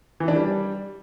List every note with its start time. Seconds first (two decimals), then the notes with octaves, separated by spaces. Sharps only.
0.20 E3
0.28 D4
0.36 G3